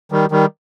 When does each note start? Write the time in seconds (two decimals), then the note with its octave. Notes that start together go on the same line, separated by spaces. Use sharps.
0.12 D#3 G3
0.32 D#3 G3